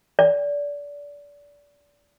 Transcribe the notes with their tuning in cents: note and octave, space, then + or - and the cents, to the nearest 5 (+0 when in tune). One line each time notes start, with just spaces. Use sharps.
D5 -25